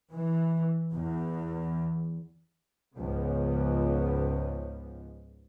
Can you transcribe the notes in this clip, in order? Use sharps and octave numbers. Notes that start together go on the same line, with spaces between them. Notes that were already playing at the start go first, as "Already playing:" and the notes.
E3
E2
C#2 G#2 C#3 F3 B3